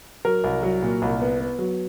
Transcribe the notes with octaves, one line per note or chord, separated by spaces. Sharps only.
F#3 A#4
C2
F#3
A#2
C2
B3
B3
F#3